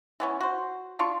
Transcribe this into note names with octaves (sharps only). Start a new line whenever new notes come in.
E3 B3 C#4
F#4 C5
D4 F4 C#6